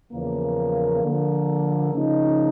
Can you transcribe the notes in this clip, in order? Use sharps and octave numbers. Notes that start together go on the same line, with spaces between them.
E2 C#3 F3 A#3
D3 F3 A#3
C#3 F3 A#3 D#4